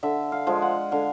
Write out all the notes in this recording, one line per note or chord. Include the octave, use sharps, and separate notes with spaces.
D3 E5
F5
F3 G#3
F#5
D3 F5